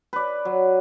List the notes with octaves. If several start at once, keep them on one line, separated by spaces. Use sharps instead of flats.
B4 D5
F#3